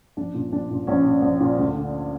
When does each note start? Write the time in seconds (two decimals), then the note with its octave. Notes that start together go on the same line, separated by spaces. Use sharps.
0.17 A#1 D4
0.34 A#2
0.52 A#1 D4
0.70 A#2
0.87 A#1 C#4
1.05 A#2
1.22 A#1
1.41 A#2
1.58 D2
1.75 D3